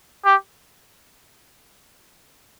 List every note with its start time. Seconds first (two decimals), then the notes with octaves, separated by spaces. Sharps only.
0.25 G4